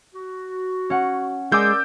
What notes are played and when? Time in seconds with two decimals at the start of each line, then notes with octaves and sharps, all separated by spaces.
0.14 F#4
0.90 C#4 F#5
1.52 G#3 A#4 D5 D6 E6 G6